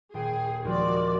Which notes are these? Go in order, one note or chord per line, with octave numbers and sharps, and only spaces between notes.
D#1 G#4 G5 C7
D#2 F3 G#3 F#4 D5